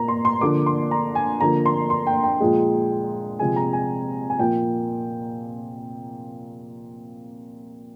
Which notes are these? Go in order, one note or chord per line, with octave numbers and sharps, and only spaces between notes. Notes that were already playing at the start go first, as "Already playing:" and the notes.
Already playing: A#2 A#3 A#5
C6
C6
D3 F3 A#3 D6
C6
A#5
G#5
D3 F3 A#3 A#5
C6
C6
G5
G5
A#2 F3 G#3
C3 F3 G#3 G#5
A#5
G#5
G#5
A#2 F3 A#3 G5